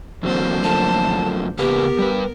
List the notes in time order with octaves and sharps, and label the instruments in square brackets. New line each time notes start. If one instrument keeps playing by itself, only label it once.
[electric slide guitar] E2 F#3 C4 [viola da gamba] D3 A#3 C5
[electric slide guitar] F#2 F3 A3 [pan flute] A5
[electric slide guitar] C#3 A#3 B4 [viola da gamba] B3 A#4 [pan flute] G4
[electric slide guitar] G3 B4